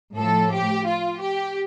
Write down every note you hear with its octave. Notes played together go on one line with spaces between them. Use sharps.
A2 F3 A4
G4
F4
G4